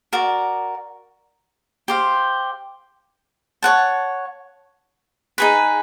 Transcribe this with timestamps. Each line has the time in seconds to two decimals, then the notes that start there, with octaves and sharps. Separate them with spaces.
0.13 F#4 A#4 D5
1.88 G4 C5 F5
3.63 C#5 F#5 A5
5.38 D#4 G#4 B4